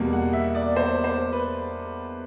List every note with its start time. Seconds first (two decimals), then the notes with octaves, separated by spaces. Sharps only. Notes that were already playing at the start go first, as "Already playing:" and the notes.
Already playing: E2 B2 G3 A#3
0.13 F#5
0.33 E5
0.55 D5
0.76 C5
1.04 C5
1.32 B4